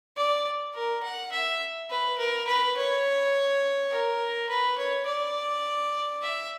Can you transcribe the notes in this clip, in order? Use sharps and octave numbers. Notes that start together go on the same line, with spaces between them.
D5
A#4
F#5
E5
B4
A#4
B4
C#5
A#4
B4
C#5
D5
E5